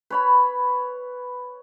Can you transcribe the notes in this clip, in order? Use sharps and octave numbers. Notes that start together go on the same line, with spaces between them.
B4 C#5 B5